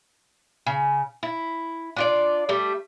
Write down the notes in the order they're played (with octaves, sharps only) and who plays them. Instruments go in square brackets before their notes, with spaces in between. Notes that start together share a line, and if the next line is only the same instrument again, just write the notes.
[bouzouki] C#3
E4
D4 F4 D5
G3 A3